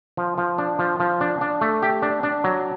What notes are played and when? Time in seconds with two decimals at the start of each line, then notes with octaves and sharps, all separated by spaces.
0.17 F3
0.38 F3
0.58 D4
0.79 F3
1.00 F3
1.21 D4
1.41 D4
1.61 A3
1.83 G4
2.02 D4
2.23 D4
2.44 F#3